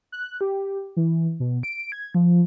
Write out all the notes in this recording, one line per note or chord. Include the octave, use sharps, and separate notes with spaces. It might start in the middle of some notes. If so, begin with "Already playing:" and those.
F#6
G4
E3
B2
D7
G#6
F3